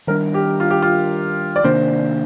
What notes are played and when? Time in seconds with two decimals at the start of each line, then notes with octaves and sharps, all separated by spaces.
0.07 D#3 G3 D4 A#4
0.34 G4
0.60 F4
0.70 G4
0.82 F4
1.56 D5
1.64 C3 D#3 A#3 D4 C5